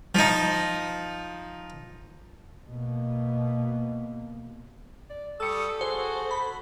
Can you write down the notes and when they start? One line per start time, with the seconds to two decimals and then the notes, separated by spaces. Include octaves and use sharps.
0.15 F3 D#4
2.69 B2 A#3
5.10 D5
5.40 G3 A4 C#6 D#6 E6 C#7
5.81 F#4 G#4 C5
6.31 B5